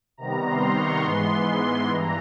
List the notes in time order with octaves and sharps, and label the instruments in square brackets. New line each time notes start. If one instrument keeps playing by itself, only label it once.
[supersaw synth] C3 D#3 G3 B3 A#5
C6
C#6
G#2 E3 G#3 B3 C6
C6
G2 E3 A#5